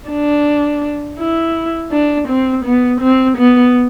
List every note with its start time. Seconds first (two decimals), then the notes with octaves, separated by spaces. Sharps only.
0.09 D4
1.19 E4
1.92 D4
2.28 C4
2.65 B3
3.01 C4
3.38 B3